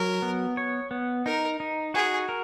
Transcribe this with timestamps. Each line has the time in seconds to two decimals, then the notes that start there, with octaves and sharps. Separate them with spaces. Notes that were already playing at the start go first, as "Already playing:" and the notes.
Already playing: F#3 A#4
0.22 B3
0.57 C#5
0.91 B3
1.26 D#4 A#4
1.60 D#4
1.94 F#4 G#4
2.29 A#4